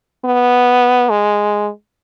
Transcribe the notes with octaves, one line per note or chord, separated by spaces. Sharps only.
B3
G#3